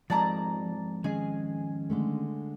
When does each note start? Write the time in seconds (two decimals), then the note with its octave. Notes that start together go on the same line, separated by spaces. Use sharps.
0.10 F2 G#2 F3 D5 A5 A#5
1.04 D#3 G#3 C#4 G#4 D#5
1.90 D3 G#3 A3